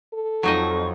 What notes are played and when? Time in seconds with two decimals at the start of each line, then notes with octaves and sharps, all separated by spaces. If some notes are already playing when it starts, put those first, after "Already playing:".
0.13 A4
0.43 F2 F#3 D#4 D#5 C#6